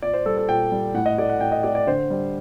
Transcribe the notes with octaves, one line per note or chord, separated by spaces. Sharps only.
A#2 D5
C5
G3 A4
A4
A#2 G5
G3
A2 F#5
D#5
A3 D5
F#5
A2 G5
D#5
A3 D5
D5
D3 C5
G3